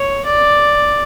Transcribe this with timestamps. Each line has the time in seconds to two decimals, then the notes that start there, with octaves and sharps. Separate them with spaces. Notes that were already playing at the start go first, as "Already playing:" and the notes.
Already playing: C#5
0.25 D5